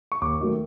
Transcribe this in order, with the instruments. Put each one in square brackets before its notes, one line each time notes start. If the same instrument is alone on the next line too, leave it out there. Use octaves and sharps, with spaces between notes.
[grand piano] C#6
D#2 D6
D#3 F#3 A3